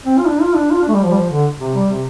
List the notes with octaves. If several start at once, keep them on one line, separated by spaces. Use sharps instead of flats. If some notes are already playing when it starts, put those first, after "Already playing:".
C4
F4
D4
F4
D4
F4
D4
A3
G3
F3
G3
F3
D3
C3
G3
C3